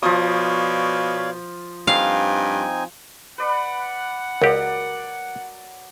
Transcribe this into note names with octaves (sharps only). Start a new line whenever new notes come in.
B2 F3 C#5 D5 F5 D#6
G2 C4 D#4 F5 G#5
B4 D5 F#5 B5
C#2 F#3 G4 A#4 D5